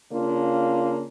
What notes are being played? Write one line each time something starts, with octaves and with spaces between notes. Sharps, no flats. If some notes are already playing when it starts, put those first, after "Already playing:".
C#3 A#3 D4 F4